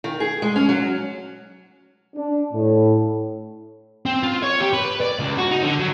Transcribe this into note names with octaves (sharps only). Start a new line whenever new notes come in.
D#3
G#4
G#3
C#4
F#3
D4
A2
C4
F4
C#5
G4
B4
B4
D5
C#2
F#4
D#4
D3
F#3